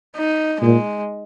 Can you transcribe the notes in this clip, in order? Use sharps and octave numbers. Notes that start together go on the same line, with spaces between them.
D#4
A#2 G#3